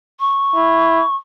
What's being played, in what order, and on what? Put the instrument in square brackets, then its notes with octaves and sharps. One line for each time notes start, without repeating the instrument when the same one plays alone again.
[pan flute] C#6
[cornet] E4